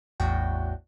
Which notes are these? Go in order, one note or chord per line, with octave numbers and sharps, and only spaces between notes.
A1 E2 A2 D4 F#4 G5